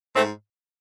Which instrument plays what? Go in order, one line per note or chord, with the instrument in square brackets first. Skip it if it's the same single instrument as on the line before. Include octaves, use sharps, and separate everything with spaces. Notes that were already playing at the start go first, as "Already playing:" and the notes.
[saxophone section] G#2 A3 C4